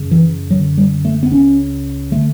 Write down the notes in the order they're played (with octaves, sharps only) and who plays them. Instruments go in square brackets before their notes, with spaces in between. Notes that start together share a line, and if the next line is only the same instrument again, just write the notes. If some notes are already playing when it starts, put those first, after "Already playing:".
Already playing: [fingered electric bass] F#2 C#3
E3
F#2 D3 F#3
G3
A3
B3
C#2 C#3 C#4
D3 A3